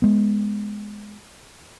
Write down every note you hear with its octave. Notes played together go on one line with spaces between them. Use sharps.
G#3 B3